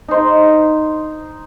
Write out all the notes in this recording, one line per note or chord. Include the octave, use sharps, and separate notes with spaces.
D#4 C5